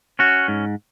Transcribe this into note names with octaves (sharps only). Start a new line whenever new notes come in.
C#4 F#4
G#2